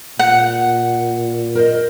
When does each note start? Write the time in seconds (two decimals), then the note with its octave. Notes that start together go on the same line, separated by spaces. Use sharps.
0.19 A#2 F#5
1.55 A#4 C5 D#5